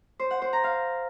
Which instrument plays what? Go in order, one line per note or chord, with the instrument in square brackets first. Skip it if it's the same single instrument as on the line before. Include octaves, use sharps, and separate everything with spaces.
[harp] C5
F#5
C5
A#5
F5